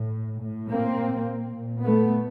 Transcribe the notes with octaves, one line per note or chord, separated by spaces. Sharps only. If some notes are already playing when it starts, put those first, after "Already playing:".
Already playing: A2
A2
A#3 C4
A#2
A#2
A3 B3